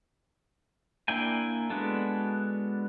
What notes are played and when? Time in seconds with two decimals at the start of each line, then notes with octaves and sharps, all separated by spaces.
1.08 A#3 D4 E4 G5 G#5
1.70 G#3 B3 D4 F#4 A4